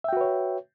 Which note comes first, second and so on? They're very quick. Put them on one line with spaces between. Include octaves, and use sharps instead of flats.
E5 G5 F#4 B4 C#5